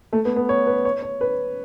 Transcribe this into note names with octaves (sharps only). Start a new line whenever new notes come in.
A3
B3
B3
C#5
B4
C#5
C#5
B4